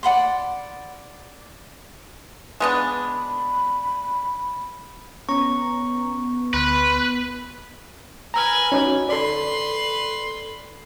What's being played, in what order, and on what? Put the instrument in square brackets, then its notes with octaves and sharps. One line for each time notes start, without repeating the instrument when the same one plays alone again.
[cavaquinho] D5 F#5 B5 C6
[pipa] G#3 B3 D4 [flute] B5
[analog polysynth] B3 [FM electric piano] C#4 A#5 [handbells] C#6
[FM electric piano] D2 C6 F6 [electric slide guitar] B4
[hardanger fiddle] B4 G#5 [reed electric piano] A#5 E6 F6
[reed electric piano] C#4 D#4 F#4
[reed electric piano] A4 D5 [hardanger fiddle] B4 C6